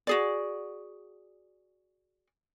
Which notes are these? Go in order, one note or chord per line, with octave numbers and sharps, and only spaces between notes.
F#4 G#4 D5